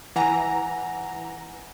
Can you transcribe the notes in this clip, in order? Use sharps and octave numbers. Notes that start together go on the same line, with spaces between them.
E3 F#5 G#5 A#5